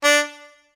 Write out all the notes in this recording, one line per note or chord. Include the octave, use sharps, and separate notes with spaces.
D4